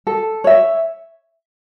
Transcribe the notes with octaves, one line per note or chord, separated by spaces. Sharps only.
A4
C#5 E5